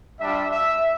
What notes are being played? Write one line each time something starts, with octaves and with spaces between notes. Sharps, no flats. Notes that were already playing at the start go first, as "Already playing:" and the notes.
G3 D4 F4 E5
E5